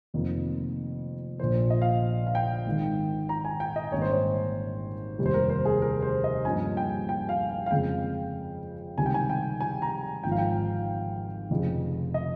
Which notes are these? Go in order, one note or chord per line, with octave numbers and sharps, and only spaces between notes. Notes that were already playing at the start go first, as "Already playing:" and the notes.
F1 F2 D#3 A#3
A#1 A#2 F3 A#3 C5
D#5
F5
F5
G5
G#1 G#2 D#3
A#5
G#5
G5
D#5
G#1 G#2 G3 A#3 C#4 C#5
C5
C#5
F1 D#2 D#3 G3
C5
A#4
C5
G#4
A#4
C5
D#5
G2 F3 A#3 C#4 G#5
G5
G5
F5
F5
F5
F2 C#3 G#3 G5
C#2 C3 D#3 G3 G#5
G5
G#5
G5
G#5
A#5
G#1 G#2 F3 G5
F5
G5
F1 F2 C#3
D#5